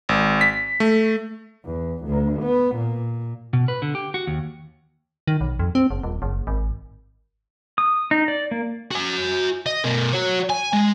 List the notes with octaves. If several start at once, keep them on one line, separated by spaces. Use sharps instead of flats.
G#1
B6
A3
E2
D2
B3
A#2
B2
B4
D3
G4
F#4
D#2
D#3
B1
F2
C4
F#1
D#1
F#1
G#1
D#6
D#4
D5
A#3
F#4 G#5
D#5
B2 A#4
F#4 C#5
G#5
G#3